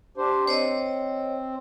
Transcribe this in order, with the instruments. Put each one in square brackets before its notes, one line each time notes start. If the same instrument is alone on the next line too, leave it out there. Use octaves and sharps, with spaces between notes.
[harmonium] D4 G4 C5
[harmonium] C4 [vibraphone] C5 C#5 D#5